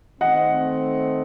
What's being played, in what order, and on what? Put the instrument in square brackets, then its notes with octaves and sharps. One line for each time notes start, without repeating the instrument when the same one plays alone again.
[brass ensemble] D#3 A3 C4 [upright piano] D#5 F#5